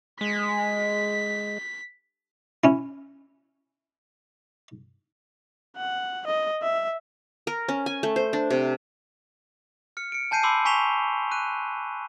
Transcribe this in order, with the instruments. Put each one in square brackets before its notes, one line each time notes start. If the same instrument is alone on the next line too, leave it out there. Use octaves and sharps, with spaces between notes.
[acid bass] G#3 [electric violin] B6
[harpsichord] C#4 E4
[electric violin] F#5
D#5
E5
[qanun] A#4
C#4
G#5
A3
C5
D4
C3
[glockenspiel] F6 C#7
C#7 D7
G#5 A5 G6 C7 D#7
B5 C6 D6 E6 C7
G#5 C#6 B6 E7 F7 G7
F#6 D#7